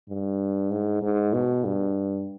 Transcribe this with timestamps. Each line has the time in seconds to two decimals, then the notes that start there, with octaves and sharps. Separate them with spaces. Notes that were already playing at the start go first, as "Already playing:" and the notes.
0.09 G2
0.71 G#2
1.02 G#2
1.33 B2
1.65 G2